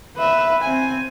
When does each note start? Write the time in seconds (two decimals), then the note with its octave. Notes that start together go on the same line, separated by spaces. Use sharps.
0.17 B4 E5
0.61 C4 G#5